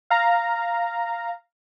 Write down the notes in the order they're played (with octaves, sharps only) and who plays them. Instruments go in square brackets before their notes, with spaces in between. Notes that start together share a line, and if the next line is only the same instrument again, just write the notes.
[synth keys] F5 A#5